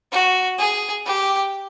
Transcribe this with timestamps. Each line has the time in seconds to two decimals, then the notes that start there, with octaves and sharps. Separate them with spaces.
0.12 F#4
0.58 G#4
1.06 G4